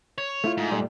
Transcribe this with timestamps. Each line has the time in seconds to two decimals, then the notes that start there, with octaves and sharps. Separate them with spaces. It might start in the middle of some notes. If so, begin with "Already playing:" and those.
0.18 C#5
0.44 A3 E4 F4
0.57 G#2
0.71 A#2 G3 A3